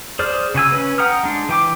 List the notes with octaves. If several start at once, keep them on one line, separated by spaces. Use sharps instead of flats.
G#4 C5 D5 F6
C#3 F#4 G#5 E6
C#4 B4
F#5 G5 A#5 D#6 F6
G#3 D4
E3 G5 D6